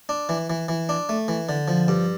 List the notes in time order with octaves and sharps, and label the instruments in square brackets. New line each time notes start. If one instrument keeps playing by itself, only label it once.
[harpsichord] D4
E3
E3
E3
D4
A3
E3
D3
F3
G2